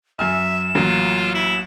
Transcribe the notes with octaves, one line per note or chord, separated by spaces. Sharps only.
F#2 E5 G#5 F6 E7
A1 F#3 A#3 F4
E4 E7